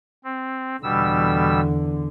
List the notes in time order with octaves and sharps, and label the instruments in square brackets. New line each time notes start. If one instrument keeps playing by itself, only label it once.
[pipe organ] C4
[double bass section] E2 D3 [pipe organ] B2 G3 E6